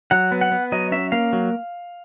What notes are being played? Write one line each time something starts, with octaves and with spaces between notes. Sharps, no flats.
F#3 F#5
B3
F#5
B3
F#3 D#5
C#4 E5
A#3 F5
F#3